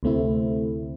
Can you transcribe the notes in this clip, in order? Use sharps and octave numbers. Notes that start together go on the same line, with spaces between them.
D2 C3 A3 C4 E4